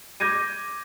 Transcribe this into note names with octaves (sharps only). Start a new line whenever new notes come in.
D6 G6 G#6 A#6 D#7